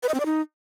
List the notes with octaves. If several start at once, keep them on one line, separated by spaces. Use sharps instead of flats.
B4
D#5
C4
D5
D#4